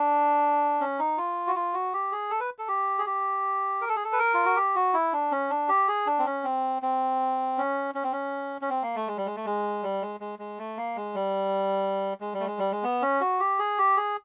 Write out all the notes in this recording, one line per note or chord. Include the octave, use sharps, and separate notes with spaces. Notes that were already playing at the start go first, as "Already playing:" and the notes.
Already playing: D4
C#4
D#4
F4
F#4
F4
F#4
G4
G#4
A4
B4
A4
G4
G#4
G4
A#4
A4
G#4
A4
B4
A#4
F4
F#4
G4
F#4
E4
D4
C#4
D4
G4
G#4
D4
C4
C#4
C4
C4
C#4
C#4
C4
C#4
C#4
C4
A#3
A3
G#3
G3
G#3
A3
G#3
G3
G#3
G#3
G#3
A3
A#3
G#3
G3
G#3
G3
A3
G#3
G3
G#3
B3
C#4
F#4
G4
G#4
G4
G#4